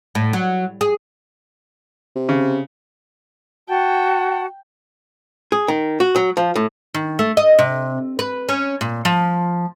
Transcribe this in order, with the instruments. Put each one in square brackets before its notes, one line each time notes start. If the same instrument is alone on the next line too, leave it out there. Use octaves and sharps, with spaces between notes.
[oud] A2
F#3
G#4
[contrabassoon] C3
[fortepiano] C#3
[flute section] F#4 F#5 A5 [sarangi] G5
[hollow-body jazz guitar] G#4
D#3
F#4
F#3
F3
A2
[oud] D#3
A3
D#5
C3
B4
C#4
A#2
F3